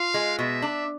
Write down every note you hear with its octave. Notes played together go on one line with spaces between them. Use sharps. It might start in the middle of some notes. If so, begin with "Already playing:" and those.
Already playing: F4 F5
G#3
B2 E5
D4